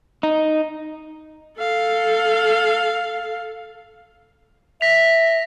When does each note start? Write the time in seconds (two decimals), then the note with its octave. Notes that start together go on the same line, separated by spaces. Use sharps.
0.23 D#4
1.58 A4 F5
4.81 E5 A#6 B6 F7